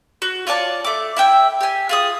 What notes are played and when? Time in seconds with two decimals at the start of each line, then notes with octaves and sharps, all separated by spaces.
0.22 F#4
0.47 F4 C#5 D5 A5
0.85 A3 D6
1.17 E4 E5 G5
1.61 G4 G#5
1.89 F4 G#4 D#6